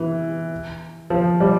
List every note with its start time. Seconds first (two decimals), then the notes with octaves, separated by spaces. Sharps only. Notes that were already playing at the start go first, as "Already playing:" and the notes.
Already playing: E3
1.10 F3
1.40 G3